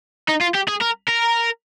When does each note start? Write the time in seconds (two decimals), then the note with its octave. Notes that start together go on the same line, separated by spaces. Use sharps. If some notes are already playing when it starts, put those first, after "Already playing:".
0.28 D#4
0.41 F4
0.55 G4
0.68 G#4
0.81 A#4
1.08 A#4